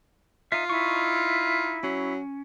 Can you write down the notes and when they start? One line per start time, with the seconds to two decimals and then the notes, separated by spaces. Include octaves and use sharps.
0.52 D#4 F4 E5
0.70 D#4 E4 C#6
1.83 F#3 C#4